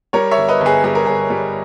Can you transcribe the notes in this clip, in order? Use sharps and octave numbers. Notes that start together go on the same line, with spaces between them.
G3 A#4 C#5
C#5 E5
G1
B4 D#5
G1 G#4 B4
G3 G#4
A#4
G1 G#4
G3